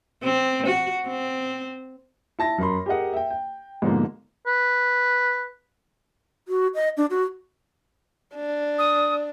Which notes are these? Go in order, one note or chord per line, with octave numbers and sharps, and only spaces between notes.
C4
F#4
C4
E4 A5 A#6
F#2 A#4 B5 C6
G4 G#4 A#4 D#5 F#5
E5 G5
G5
G#2 B2 D3 F3 A#3
B4
F#4
D#5
D4
F#4
D4
D#6